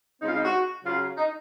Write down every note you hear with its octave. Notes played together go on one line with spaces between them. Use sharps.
C#3 G#3 C4 D#4
F4
D#4
F#4
C#3 F#3 C#4 F4
D#4